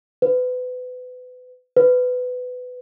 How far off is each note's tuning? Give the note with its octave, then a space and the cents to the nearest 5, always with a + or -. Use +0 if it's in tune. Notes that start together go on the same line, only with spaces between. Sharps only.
B4 +30
B4 +20